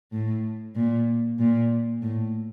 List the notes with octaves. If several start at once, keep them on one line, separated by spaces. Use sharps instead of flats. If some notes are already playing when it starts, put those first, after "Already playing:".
A2
A#2
A#2
A2